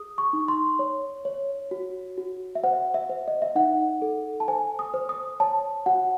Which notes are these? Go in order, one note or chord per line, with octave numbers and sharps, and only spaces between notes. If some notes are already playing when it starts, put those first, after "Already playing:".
Already playing: G#4 D#6
C#6
D#4
C6
C#5
C#5
F#4
F#4
E5
C5 F#5
E5
C5
D#5
E5
D#4 F#5
A4
A5
C5 G#5
D#6
C5
D#6
C#5 A5
F#4 F#5